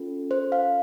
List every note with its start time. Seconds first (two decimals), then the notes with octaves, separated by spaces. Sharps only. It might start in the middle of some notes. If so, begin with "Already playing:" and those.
Already playing: C#4 F4 A4
0.31 C5
0.52 F5